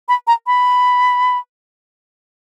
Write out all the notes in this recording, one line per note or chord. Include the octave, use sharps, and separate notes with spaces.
B5
A#5
B5